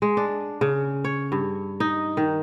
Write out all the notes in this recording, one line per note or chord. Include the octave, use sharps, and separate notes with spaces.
G#3
D4
C#3
C#5
G2
D#4
D#3